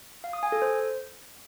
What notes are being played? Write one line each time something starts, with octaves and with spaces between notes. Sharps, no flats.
F5
D#6
G#5
A4
C5